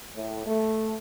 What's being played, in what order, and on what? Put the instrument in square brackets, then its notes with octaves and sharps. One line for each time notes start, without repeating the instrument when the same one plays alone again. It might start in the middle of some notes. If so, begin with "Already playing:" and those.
[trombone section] A2
A3